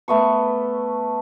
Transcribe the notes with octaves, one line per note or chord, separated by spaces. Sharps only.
A3 B3 C#6